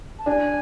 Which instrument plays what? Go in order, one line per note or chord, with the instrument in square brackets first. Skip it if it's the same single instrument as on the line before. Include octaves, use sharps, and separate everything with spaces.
[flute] A5
[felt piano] D4 [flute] G#5